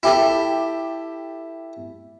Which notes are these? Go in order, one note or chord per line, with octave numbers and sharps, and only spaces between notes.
E4 G4 A4